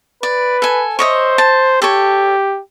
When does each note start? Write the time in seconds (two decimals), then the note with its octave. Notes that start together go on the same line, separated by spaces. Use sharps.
0.23 B4 D5
0.62 A4 G#5
0.99 C5 C#5 D#5 E5
1.38 A5
1.82 G4 A4 C#5